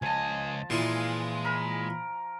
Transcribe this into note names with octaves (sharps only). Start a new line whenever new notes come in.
C#2 F3 D#5 G#5 A5
A#2 E3 G#3 F5
A#4 B5